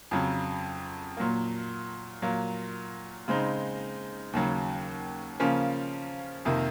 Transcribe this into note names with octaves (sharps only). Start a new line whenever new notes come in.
F2 C#3 F#3
A#2 F#3 A#3
A#2 F#3 A#3
C#3 G#3 C4 D#4
D#2 C#3 F#3
C#3 F3 A#3 C#4
F2 C3 D#3 A#3